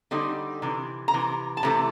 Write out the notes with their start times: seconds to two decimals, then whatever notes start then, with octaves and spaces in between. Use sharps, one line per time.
0.11 D3 G3 C4 D#4
0.62 C3 E3
1.08 A#5
1.14 C3 E3
1.57 A5
1.63 C3 E3 A3 A#5